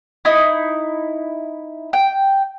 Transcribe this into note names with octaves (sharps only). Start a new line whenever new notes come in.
D#4 E4
G5